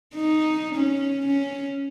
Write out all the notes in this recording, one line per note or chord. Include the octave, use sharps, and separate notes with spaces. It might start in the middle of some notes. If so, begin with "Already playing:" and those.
D#4
C#4
C#4